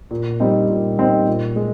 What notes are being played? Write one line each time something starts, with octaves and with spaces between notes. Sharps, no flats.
A#2
G3 C4 D#4
A#2
G3 C4 D#4
A#2
G#3